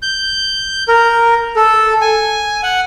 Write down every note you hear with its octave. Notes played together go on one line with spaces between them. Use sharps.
G6
A#4
A4
G#5
F#5